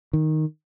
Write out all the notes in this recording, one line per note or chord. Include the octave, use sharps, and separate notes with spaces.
D#3